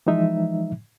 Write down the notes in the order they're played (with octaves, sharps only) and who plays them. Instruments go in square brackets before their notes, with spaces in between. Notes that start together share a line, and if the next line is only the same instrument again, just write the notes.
[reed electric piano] E3 F3 G#3 D#4 E5